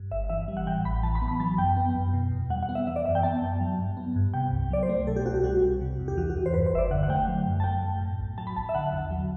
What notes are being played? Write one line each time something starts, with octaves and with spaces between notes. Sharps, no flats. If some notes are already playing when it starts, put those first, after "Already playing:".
Already playing: G2
G1 E5
E3 E5
G3
F#5
A2 G5
A1 B5
E3 A5
B5
B3
B5
F#3 A5
F#2 G5
B3
F#2
B2
E2
G3 F#5
F#5
B3
E5
E3 E5
D5
F#2 E5
G5
B3 A5
F#2
F#3
G2
B3
G2
C3 G5
C2
F#3 D5
C5
A3
B2 A4
G4
C2 F#4
G4
G3 F#4
C2
C3
E2
G4
E3 F#4
F#4
E2
C5
G2 B4
C5
G1 E5
D5
D3 F#5
F#5
A3 G5
F#3
F#2
A5
A3 G5
F#2
A2
B1
F#3 A5
B5
B1 A5
E5
D3 F#5
E2
F#3